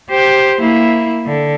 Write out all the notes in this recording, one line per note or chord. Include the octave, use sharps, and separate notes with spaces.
G4 C5
A#3 E4
D3